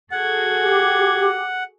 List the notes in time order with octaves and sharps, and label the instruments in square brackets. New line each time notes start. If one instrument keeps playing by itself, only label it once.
[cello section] F#4 G#4 A4 [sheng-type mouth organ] F#5 [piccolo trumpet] G#6
[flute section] G4